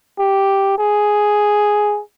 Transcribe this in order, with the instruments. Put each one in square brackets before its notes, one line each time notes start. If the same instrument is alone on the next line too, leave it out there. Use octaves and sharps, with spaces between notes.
[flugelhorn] G4
G#4